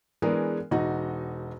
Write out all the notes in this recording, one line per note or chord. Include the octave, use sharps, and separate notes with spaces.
E3 G#3 B3 D4 G#4 A#4
E1 D#4 F#4 D#5